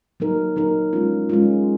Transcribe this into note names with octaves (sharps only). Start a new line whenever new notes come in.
F#3 A#3 D#4 A#4
F#3 A#3 D#4 A#4
G#3 C#4 F4
G#3 C#4 F4